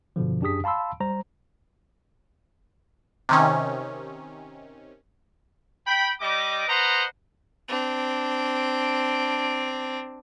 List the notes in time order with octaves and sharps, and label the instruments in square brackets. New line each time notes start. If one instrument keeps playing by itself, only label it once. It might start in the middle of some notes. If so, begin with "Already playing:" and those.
[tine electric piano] G2 B2 D3 F3
F#2 D4 G4 G#4 D#6 B6
F5 A5 B5 C6 E6
G3 C5 A#5
[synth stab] C3 D#3 C#4
[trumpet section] G5 B5
G3 D#5 D6
B4 C5 D#5 F#5 A#5 C6
[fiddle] C4 D4